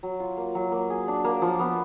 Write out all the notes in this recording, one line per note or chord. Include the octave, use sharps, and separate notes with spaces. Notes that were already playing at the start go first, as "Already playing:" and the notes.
F#3
F4
A#3
F#3
A#3
G#4
D4
A#3
F3
B3